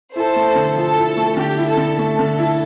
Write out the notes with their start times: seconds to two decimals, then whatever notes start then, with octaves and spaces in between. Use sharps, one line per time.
0.15 E4 A4 C5
0.36 A3
0.55 D3
0.76 F3 A4
0.97 E4
1.17 A3
1.37 D3 G4
1.58 E4
1.67 A4
1.77 D3
1.98 A3 A4
2.19 D3
2.39 E4